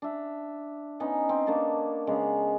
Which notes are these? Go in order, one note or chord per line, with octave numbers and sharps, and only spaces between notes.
D4 E5
B3 C#4 D#4
C4
A#3 D4 C#5 A5
C#3 G#3 B3